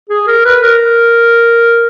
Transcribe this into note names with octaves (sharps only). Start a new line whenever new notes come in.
G#4
A#4
B4
A#4